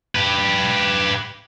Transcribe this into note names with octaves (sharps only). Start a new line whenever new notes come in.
G4 B4